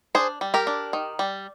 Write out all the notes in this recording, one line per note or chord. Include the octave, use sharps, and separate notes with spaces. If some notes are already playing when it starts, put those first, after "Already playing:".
D4 G#4 C5
G3
G4 A#4
D4
D#3
G3